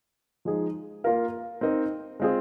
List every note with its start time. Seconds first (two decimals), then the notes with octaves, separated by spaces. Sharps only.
0.45 F3 G#3 D#4 G#4
1.04 A#3 F4 A#4 F5
1.61 C4 D#4 A#4 D#5
2.20 G#3 C4 F4 G#4 D#5